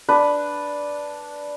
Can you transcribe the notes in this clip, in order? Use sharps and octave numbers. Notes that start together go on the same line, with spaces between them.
D4 B4